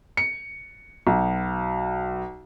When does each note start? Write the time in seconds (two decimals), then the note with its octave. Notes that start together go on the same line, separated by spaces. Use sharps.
0.17 C#7
1.07 B1